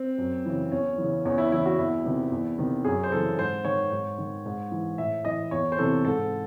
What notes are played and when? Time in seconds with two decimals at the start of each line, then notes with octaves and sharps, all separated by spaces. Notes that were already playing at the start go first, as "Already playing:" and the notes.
Already playing: C4
0.18 F#2
0.45 C#3 E3
0.72 E2 C#4
0.98 C#3 E3
1.25 E2 C#4
1.38 E4
1.52 C#3 E3 E4
1.66 F#4
1.79 E2 E4
2.05 C3 D#3
2.32 E2
2.58 C3 D#3
2.85 F#2 G#4
3.03 C5
3.12 C#3 E3 A4
3.39 G#2 C5
3.65 D#3 C#5
3.92 G#2
4.18 D#3
4.46 G#2
4.72 E3
4.98 A2 E5
5.25 E3 D#5
5.51 E2 C#5
5.72 C5
5.79 C3 E3 A4
6.05 G#2 A4